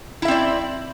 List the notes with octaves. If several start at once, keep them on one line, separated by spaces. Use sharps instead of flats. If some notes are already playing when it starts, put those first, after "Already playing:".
C4 E4 D5 E5